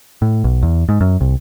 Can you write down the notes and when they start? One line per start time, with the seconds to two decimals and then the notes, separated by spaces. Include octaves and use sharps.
0.22 A2
0.44 B1
0.63 E2
0.89 G#2
1.01 F#2
1.21 C2